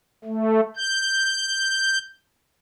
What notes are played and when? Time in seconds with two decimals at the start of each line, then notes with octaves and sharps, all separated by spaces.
0.25 A3
0.76 G6